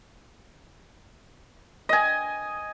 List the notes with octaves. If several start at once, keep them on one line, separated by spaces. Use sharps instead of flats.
D#5 G#5